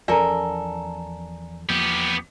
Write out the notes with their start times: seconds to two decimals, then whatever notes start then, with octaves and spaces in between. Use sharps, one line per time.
0.08 E2 F3 C#4 A4 A#4 D5 G#5 A#5
1.69 E2 F3 A#3 B3 G4